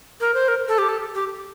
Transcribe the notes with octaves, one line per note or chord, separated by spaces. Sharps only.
A#4
C5
A#4
A4
G4
A4
G4